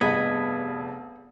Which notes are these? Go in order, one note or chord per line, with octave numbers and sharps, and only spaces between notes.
F1 G2 B3 G#4 D#5 D#6 G#6 B6